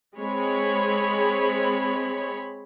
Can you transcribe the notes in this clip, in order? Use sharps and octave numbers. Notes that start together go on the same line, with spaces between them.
G#3 C4 G#4 C#5 B5